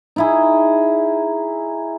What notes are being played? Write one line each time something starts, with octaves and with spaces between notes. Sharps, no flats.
D#4 E4 G#4